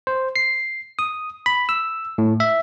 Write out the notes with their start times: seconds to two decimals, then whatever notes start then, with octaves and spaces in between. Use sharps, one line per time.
0.07 C5
0.36 C7
0.99 D#6
1.46 B5
1.69 E6
2.18 A2
2.40 E5